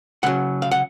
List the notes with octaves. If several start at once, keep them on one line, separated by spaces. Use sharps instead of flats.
C#3 F#3 F#5
F5
F#5